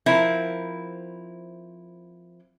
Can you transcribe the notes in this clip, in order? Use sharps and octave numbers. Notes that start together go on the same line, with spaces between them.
F3 C4 E4 A#4